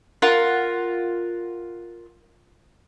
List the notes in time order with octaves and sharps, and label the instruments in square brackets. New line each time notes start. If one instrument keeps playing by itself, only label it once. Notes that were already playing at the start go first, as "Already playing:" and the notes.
[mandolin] F4 A#4 F#5